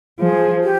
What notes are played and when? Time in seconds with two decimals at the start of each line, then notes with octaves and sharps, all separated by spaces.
0.19 F3 G#4
0.64 G4